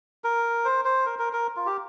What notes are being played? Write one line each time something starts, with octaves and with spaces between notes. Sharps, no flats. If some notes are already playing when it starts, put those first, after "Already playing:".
A#4
C5
C5
A#4
A#4
A#4
F4
G4